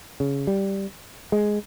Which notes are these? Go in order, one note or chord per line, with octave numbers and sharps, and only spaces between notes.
C#3
G3
G#3